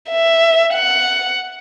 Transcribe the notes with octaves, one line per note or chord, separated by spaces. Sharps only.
E5
F#5